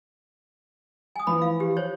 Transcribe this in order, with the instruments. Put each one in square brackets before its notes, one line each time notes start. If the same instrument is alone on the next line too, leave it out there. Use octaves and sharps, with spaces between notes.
[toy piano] G#5 D#6
[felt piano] E3 F3 B4 [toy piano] B5
[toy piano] F5
G4
C5 C#5